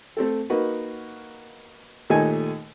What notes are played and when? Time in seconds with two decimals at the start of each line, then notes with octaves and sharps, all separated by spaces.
0.17 A3 C4 A4
0.50 A#3 D#4 F#4 B4
2.10 D#2 A#2 A3 D#4 G#5 A5